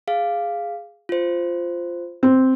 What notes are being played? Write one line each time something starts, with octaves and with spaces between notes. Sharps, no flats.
G#4 F5
F4 C5
C4